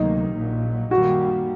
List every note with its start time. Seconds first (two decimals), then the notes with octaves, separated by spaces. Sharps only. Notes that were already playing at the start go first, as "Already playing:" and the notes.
Already playing: D2 C3 D#3 F#3 A#3 D#4
0.35 A#1 A#2 F#3
0.90 F#2 D#3 G3 A#3 F#4